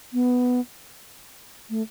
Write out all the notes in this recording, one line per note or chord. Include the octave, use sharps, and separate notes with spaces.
B3
A3